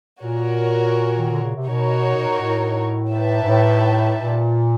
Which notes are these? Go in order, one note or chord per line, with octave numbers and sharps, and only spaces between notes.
A#2 F#4 A#4 C#5
D#3
D3
C#3
C3
B2 D#4 F#4 A#4 C#5
B2
A#2
A2
D#4 G4 B4 E5 A5
G#2
A2
A#2